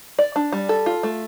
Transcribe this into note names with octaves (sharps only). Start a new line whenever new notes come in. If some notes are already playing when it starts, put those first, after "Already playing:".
D5
D4
G3
A4
F4
A3